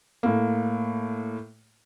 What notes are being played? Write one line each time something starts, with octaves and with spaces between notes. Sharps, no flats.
A2 A#3